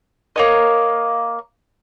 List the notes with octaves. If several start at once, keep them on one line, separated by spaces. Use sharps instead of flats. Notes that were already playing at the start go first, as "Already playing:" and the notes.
A#3 C#5 D#5